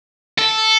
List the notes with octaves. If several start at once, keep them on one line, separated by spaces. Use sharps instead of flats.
A4